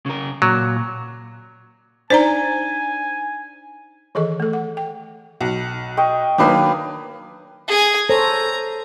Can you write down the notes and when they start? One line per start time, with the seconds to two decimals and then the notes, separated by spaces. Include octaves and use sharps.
0.06 C#3 A#4
0.42 A#2 F#3
2.10 D4 D#4 C5 D5 G#5 A#5
4.15 D#3 E3 G#4 A4 D#5 C#6
4.40 A3 A4
4.53 F#5
4.77 G5
5.41 B1 F#5
5.97 D#5 G5 C#6
6.38 D#3 F#3 A#3 D4 B4 D#6
7.68 G#4 G#5
8.09 A4 C5 C#5 A#5